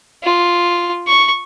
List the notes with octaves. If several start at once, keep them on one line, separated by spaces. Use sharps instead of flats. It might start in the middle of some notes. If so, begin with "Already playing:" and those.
F4
C#6